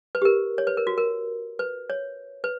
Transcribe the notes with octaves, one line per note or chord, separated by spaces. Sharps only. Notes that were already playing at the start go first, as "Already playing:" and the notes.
B4
G4
A#4
C#5
B4
A#4
F#4
A#4
B4
C#5
B4